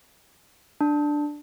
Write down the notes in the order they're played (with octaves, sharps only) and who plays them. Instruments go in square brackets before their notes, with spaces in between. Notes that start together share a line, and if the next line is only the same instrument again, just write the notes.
[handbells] D4